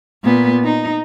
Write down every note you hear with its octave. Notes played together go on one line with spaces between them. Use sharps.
A#2 B3
D#4